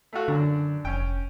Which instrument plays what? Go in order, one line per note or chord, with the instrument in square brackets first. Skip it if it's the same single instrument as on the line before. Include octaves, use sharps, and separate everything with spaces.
[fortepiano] A3 F4 F#4
[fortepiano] F#2 D4 [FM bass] D3
[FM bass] F1 [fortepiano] C#4 G5